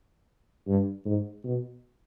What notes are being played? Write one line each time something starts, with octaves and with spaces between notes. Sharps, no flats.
G2
G#2
B2